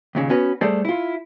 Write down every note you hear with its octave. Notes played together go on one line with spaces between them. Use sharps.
D#2 A#2 C#3
B3 C#4 F#4 B4
G3 A3 G#4 A4 C5 D5
E4 F4